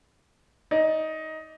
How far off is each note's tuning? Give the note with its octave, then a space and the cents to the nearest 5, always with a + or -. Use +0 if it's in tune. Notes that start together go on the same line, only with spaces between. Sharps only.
D#4 +15 D5 +0